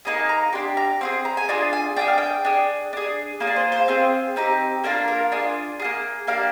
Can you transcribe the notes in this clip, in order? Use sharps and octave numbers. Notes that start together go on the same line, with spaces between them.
A#3 D#4 G#4
A#5
D4 G4 C6
A#5
C4 F4 G#4 C6
A#5
G#5
D4 F4 G#4 A#5
G#5
D4 F4 G#4 G5
F5
G5
D4 G#4
D4 G#4
A#3 F4 G#4
D5
C5
C5
C4 F4 G#4
C4 D#4 G4
A#3 D4 F4 A#4
A#4
D4 F4 G#4
A#3 F4 G#4
A#3 D4 G4 F5